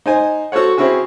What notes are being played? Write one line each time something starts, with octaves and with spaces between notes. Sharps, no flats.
D#4 C5 G#5
F#4 A4 C5 C#5 F#5
C4 C#4 E4 F#4 G#4